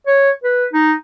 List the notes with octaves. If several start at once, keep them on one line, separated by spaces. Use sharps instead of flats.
C#5
B4
D#4